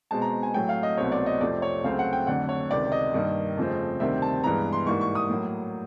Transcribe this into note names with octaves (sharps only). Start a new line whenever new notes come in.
B2 G#3 C4 A5
A#5
G#5
A2 F#3 A3 G5
F5
D#5
C2 B2 F#3 A3 C4 C#5
D5
D#5
F2 C3 F3 A3 C4 D5
C#5
C#2 C#3 F#3 A3 C4 F5
F#5
G5
F2 D3 F#3 A3 F#5
C#5
C#2 C3 D#3 D5
D#5
G2 D#3 G3 A#3
F2 C#3 F3 A3 C4
D2 C3 D#3 G3 C4 E5
A5
G2 E3 G#3 B3 A#5
C6
G#2 E3 G3 A#3 C#6
C#6
D#6
A2 F#3 A#3